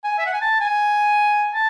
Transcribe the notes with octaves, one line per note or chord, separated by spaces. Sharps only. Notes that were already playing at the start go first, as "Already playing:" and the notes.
G#5
E5
F#5
G#5
A5
G#5
A5